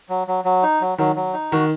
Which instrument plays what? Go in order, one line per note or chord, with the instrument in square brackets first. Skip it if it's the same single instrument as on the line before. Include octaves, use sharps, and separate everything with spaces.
[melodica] F#3
F#3
F#3
D#4
F#3
[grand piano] D#3 [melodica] F#3
[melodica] F#3
D#4
[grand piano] D#3 [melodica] F#4